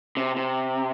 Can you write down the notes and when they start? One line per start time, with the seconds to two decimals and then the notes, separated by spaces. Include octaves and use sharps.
0.17 C3
0.37 C3